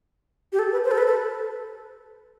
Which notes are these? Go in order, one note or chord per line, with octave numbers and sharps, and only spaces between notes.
G4
A4
B4
C5
A4
B4
A4